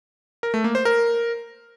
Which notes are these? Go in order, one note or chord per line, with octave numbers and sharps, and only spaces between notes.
A#4
A3
A#3
C5
A#4